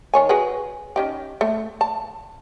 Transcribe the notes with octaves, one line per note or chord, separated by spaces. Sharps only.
D#3 C#5 G#5
F#4 G#4 B4
C#4 D#4 G4
A3
A5